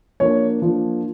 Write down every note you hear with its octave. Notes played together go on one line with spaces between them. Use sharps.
F3 A#3 D4 C#5
F3 A#3 D4